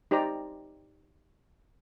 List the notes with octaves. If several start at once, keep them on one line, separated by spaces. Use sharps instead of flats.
D#4 G4 C5 D5 A#5